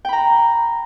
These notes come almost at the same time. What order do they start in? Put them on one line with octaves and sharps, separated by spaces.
G5 B5 A#5